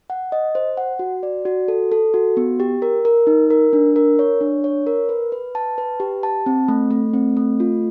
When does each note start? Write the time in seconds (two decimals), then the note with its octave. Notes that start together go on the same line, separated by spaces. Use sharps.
0.10 F#5
0.32 D#5
0.55 C5
0.77 F#5
0.99 F#4
1.23 D5
1.45 F#4
1.68 A4
1.92 A4
2.14 F#4
2.37 B3
2.60 G4
2.82 A#4
3.05 A#4
3.27 D#4
3.50 A#4
3.73 D4
3.96 A#4
4.19 C#5
4.41 D4
4.64 C#5
4.87 A#4
5.09 B4
5.32 B4
5.55 A5
5.78 B4
6.00 G4
6.23 A5
6.46 C4
6.68 A3
6.91 A3
7.14 C4
7.37 A3
7.60 F4